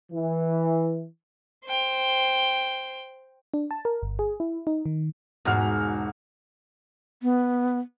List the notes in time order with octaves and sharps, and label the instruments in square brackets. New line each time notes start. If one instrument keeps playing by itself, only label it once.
[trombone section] E3
[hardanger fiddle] C5 G5
[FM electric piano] D4
A5
A#4
G1
G#4
E4
D#4
D#3
[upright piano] E1 F#4 F6 [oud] G#2
[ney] B3